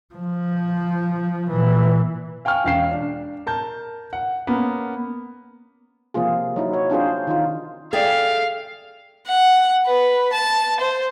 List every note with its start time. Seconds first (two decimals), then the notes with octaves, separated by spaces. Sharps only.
0.14 F3
1.50 A#2 E3
2.45 F5 G5 G#5 C#6 F6
2.64 E1 C#4 F5 G5 C7 E7
2.91 D4
3.46 A#4 A5 G6
4.13 F#5
4.47 A#3 B3 C#4
6.14 C3 F3 A#3 F4 G#4
6.56 F#3 D#4 E4
6.73 C#5
6.90 C4 D4 F4 G#4 C5
7.27 D#3 D#4 F4
7.93 G#4 A4 D5 E5 F5 G5
9.28 F#5
9.86 B4
10.32 A5
10.80 C5